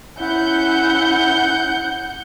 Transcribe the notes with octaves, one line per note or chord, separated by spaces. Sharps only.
C#4 E4 F#5 G6 C#7